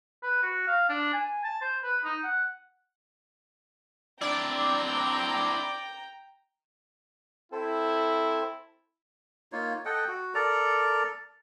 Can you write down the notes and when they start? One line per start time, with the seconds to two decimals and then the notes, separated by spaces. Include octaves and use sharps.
0.23 B4
0.43 F#4
0.67 F5
0.89 D4
1.13 G#5
1.44 A5
1.62 C5
1.83 B4
2.04 D#4
2.24 F#5
4.21 C4 D4 E4 D5 G5 A#5
7.52 C4 E4 A4 C5
9.52 A#3 D#4 F4 C#5
9.85 A4 D#5 F#5 G5
10.08 F#4
10.35 A4 A#4 D5 A#5